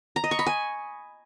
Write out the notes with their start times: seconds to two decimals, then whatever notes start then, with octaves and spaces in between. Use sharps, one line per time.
0.16 A#5
0.24 D#5
0.31 C#6
0.39 B5
0.46 G#5